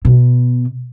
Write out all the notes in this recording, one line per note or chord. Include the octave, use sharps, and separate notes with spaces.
B2